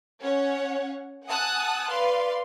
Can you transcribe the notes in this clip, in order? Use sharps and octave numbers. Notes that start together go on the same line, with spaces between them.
C#4 C#5 F#5
F#5 G#5 A5 D#6 E6 F#6
B4 D5 F5 C6